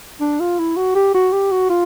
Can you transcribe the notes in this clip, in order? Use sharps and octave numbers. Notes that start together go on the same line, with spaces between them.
D4
F4
E4
F#4
G4
F#4
G4
F#4
F4